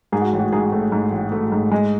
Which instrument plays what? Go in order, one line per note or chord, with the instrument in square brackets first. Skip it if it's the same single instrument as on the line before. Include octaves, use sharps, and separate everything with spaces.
[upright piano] G#2 G#4
F#4
A1
F#4
G#2 G#4
A3
G#2
A1
A3
G#2
G#3